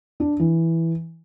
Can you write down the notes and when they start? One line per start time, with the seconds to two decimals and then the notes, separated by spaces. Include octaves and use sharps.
0.20 D4
0.39 E3